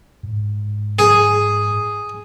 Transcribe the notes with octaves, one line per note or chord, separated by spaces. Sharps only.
G#2
G#4